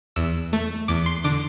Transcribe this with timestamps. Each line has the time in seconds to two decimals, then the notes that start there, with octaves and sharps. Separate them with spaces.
0.16 E2 E6
0.53 A3
0.88 E2 D6
1.06 C6
1.24 D3 D6